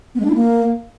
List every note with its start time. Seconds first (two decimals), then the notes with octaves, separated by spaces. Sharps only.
0.15 B3
0.20 G#3
0.25 D4
0.30 E4
0.35 A#3